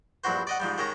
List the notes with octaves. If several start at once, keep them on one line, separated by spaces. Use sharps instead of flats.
A#1 G2 E4 F#4 C5
D5 D#5 F#5
G#2 F3 G3
D#3 G#3 C#4 A#5